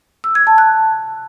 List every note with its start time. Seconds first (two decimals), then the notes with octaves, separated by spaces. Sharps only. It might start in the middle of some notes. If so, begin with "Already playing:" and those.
0.24 E6
0.35 G#6
0.47 A5
0.58 F#6